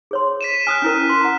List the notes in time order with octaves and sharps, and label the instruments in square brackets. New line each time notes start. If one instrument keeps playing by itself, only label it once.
[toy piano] G#4 C#5 C6
[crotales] B6 D#7 E7
[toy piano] G#5 D#6 [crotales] F6 F#6
[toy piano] C#4 E4 A#4
C6
F#5 A#5